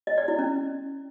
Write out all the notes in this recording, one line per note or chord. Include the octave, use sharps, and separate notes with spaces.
D#5
D5
E4
C#4